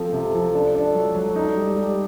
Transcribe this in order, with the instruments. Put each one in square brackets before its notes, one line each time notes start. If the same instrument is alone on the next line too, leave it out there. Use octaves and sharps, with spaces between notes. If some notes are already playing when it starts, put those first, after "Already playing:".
Already playing: [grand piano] F3 C4 [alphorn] A4
[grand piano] C3
F3
D4
D4
F#3
F#3
D#4
G3
G3